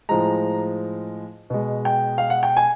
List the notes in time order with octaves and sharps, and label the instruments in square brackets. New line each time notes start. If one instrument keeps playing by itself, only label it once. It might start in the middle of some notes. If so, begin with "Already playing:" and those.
[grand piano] A2 F3 G#3 A#5
B2 G#3
G5
F5
F#5
G5
G#5